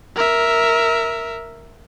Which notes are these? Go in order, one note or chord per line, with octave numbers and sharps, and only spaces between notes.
A#4 E5